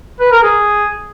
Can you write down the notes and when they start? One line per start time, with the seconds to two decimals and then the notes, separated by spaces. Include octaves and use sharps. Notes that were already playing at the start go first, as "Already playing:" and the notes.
0.20 B4
0.32 A#4
0.43 G#4